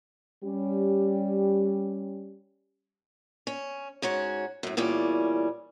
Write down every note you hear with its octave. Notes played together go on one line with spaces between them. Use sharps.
G3 C#4 G4
C#4
G#2 C#4 F#4 C#5
F#2 A2
E2 A#2 G3 C#4